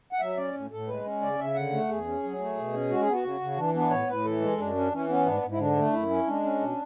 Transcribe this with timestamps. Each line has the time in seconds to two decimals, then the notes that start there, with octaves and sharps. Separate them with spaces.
0.13 F#5
0.20 F#3 E5
0.37 C#4 D5
0.54 A2
0.71 A2 A4
0.88 G#3 B4
1.05 C#4
1.22 C#3 D5
1.39 C#3 E5
1.55 D3 F#5
1.72 A3
1.89 E2 G#4
2.06 C#4
2.23 F#3
2.39 A3
2.57 B2
2.74 C#4
2.90 G#3 F#4
3.01 G#4
3.07 B3
3.13 F#4
3.24 C#3
3.41 C#3
3.57 E3 D4
3.74 B3 D4
3.90 A2 C#5
4.07 A2 B4
4.25 E3 A4
4.41 G#3
4.58 F#2 D4
4.76 C#4
4.92 E3 C#4
5.09 B3 C#4
5.26 G#2 D4
5.43 G#2
5.52 E4
5.59 D3 D4
5.77 A3
5.93 F#2 E4
6.10 C#4
6.27 G#3 D4
6.43 C#4
6.60 B2